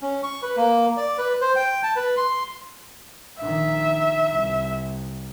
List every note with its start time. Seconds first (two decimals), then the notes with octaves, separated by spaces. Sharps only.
0.02 C#4
0.23 C#6
0.42 B4
0.57 A#3
0.97 D5
1.18 B4
1.41 C5
1.56 G5
1.83 A5
1.96 B4
2.17 C6
3.41 A#1 D#3 E5
4.32 C2